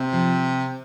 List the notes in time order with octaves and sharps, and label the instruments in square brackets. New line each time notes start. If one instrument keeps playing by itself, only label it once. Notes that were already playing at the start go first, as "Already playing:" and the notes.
Already playing: [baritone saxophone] C3
[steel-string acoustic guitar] F3